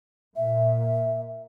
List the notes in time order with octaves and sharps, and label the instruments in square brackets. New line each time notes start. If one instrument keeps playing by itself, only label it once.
[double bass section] A#2 [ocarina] E5